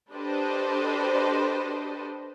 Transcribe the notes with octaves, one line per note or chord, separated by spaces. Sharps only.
D4 G4 A4 B4 C5 D#5